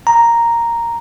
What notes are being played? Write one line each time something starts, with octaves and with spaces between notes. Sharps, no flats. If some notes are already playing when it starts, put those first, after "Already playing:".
A#5